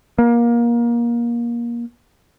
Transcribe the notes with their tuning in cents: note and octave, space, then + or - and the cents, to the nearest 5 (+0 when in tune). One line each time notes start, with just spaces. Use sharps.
A#3 +25